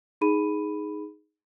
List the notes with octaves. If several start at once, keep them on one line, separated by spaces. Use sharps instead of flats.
D#4 G#4 B5 D#7